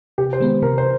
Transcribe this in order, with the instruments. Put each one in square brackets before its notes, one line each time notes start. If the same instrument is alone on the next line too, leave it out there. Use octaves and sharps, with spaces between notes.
[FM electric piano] C3 [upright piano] G4
[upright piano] C5
[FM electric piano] D#3 G#3 B3
[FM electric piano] C3 [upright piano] A#4
[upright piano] C5